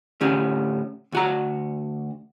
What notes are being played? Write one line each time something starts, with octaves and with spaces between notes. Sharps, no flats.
A2 D3 C#4 G4
D2 F#4 A#5